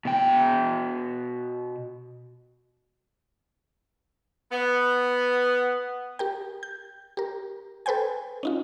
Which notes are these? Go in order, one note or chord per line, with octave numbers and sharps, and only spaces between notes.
B2 G5
B3
G4 A#4 G5
G6
G4 A#4
A4 B4 C5 G5 G#5
C#4 D#4 F4